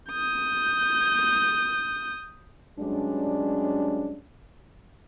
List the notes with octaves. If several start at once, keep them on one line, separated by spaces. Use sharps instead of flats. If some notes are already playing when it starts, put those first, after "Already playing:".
D#6 G6
G2 F#3 G#3 C#4 D4